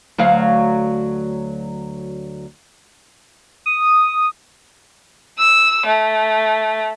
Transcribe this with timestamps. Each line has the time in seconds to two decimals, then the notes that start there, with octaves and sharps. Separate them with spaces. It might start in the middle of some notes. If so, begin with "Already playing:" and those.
0.18 D2 F#3 F5
3.66 D#6
5.38 E6
5.86 A3